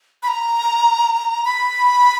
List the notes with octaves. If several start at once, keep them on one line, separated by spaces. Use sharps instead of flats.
B5
A#5
B5